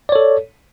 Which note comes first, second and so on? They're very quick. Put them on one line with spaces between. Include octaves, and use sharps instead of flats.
D5 C#5 A4